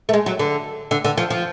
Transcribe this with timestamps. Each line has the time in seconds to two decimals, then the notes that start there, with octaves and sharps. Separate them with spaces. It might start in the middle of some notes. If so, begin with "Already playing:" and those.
0.09 A3
0.13 G#3
0.26 F#3
0.39 D3
0.91 D3
1.04 D3
1.18 F3
1.30 F3